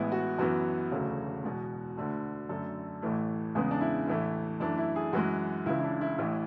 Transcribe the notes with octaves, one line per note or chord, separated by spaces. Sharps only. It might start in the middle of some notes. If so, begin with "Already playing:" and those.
Already playing: A1 A2 G#3 B3 E4
F#4
F#2 E3 B3 F#4
E1 D2 C#3 F#3 A3
E2 B2 G#3
D2 D3 A3
F#2 D3 A3 A4
A1 A2 E3 A3
E2 C#3 G#3 B3 G#4
D4
E4
A1 A2 E3 A3 E4
F#2 E3 A3 D4
E4
G#4
F#2 E3 G#3 F#4
C#2 C#3 E3 E4
E4
D4
E4
A1 A2 E3 E4